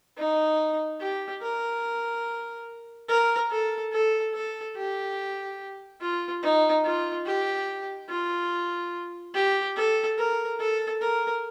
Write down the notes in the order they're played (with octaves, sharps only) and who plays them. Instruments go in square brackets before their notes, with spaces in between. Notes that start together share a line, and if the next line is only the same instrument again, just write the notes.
[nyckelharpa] D#4
G4
A#4
A#4
A4
A4
A4
G4
F4
D#4
F4
G4
F4
G4
A4
A#4
A4
A#4